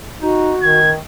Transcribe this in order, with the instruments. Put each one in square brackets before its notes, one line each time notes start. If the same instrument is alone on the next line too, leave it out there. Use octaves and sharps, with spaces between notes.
[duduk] D#4 [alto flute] F#4
[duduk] D#3 [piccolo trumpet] G#6